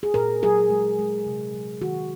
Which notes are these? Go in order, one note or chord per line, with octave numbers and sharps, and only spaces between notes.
G#4
A#2 A#4
F#3 G#4
G#3
G#3
C3
F#3
D#3 F#4